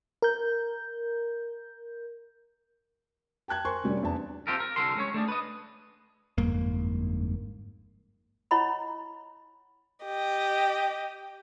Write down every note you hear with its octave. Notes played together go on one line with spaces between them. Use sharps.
A#4 G6
G5 A5 F#6 G#6
A#4 C5 G#5 C6 C#6
C3 G3 C#4 D4
E2 D4 A5
C4 F4 G4 A4 A#4
A#4
C2 D3 A4 A#4 C6
G#3 C#4 C#5
A3 D4 G#4 D5
B4 D#5
G1 F2 G#2 A#3
E4 C#5 D#5 F#5 A#5 B5
G4 D#5